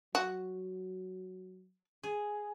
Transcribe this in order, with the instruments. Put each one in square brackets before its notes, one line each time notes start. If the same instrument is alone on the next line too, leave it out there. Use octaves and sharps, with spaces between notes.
[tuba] F#3 [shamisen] F#4
[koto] G#4